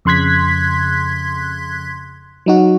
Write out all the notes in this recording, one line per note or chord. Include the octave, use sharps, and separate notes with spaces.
F2 C#3 C6 F#6 G#6 B6
F#3 D#4 F#4